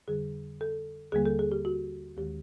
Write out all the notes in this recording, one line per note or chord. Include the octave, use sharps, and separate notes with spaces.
F2 D3 G3 G#4
A4
D#2 D3 G3 A#3 G#4
A4
G#4
G4
F#4
D#2 D#3 G#3 G4